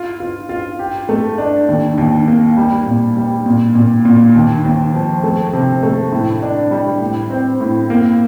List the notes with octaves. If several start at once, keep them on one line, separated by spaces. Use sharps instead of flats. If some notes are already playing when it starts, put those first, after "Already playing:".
Already playing: F4
F4
F4
G4
A3
D4
D#2
D#2
A#3
G3
A#2
G3
A#2
A#2
A#2
D#2
D#2
F3
A3
C3
A3
A2
D4
G3
A2
C4
A2
A#3